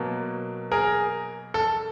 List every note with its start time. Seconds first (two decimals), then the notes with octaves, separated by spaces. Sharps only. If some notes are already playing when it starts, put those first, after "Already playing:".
Already playing: B2 F#3 A#3
0.72 G#4 A#4
1.54 A4